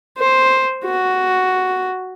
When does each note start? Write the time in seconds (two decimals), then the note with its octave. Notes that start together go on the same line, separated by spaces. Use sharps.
0.18 C5
0.84 F#4